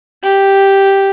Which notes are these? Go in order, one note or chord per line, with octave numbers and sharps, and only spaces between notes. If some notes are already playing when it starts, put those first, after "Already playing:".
G4